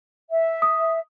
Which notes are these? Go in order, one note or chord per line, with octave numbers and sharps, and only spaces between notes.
E5
D#6